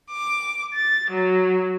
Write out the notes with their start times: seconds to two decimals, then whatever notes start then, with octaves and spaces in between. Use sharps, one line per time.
0.10 D6
0.74 A6
1.09 F#3